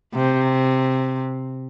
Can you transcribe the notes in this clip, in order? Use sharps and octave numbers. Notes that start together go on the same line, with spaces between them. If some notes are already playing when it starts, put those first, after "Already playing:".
C3